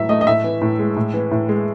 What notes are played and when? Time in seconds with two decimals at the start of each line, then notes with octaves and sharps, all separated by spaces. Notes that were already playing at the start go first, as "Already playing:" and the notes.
Already playing: A2 E3 F#3 E5
0.09 A3 D#5
0.21 D#5
0.27 A2 E5
0.44 E3
0.62 A2
0.79 G#3
0.96 A2
1.14 E3
1.31 A2
1.49 G#3